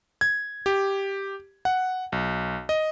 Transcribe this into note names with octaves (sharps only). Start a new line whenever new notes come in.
G#6
G4
F#5
B1
D#5